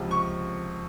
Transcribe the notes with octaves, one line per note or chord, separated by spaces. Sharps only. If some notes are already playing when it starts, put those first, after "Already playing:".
Already playing: C#2 C3 F3
C#6